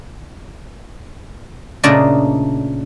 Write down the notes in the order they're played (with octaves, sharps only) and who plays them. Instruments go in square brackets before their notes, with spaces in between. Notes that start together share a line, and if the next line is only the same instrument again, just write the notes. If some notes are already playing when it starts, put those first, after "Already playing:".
[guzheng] A#2 C#3 A3 D4 D5 D#5